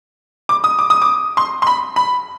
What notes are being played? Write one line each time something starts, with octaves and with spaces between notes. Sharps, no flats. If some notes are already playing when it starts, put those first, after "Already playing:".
D6
D#6
D6
D#6
D6
C6
C6
B5
B5